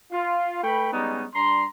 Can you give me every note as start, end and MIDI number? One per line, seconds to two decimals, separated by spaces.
0.12 0.61 65
0.63 0.88 57
0.63 0.88 71
0.63 0.88 79
0.63 0.88 83
0.92 1.24 55
0.92 1.24 56
0.92 1.24 59
0.92 1.24 61
0.92 1.24 63
1.34 1.65 55
1.34 1.65 62
1.34 1.65 82
1.34 1.65 84